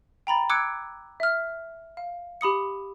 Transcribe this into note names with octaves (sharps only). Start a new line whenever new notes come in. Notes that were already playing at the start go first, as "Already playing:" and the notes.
G5 A#5 B5 A6
D6 E6 F#6 G#6 C#7 D7
E5 F6
F5
G4 B5 D#6 C#7